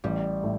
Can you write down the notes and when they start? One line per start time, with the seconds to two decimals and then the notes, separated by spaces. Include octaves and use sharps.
0.04 A1 G3
0.43 A2